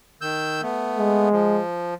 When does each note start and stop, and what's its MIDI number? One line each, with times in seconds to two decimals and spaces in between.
0.21 0.61 51
0.21 0.61 88
0.21 0.61 91
0.62 1.29 57
0.62 1.29 59
0.99 1.61 56
1.32 1.94 53